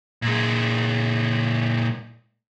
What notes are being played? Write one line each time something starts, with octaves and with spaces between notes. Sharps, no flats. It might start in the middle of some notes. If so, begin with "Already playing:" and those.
A#2 G#3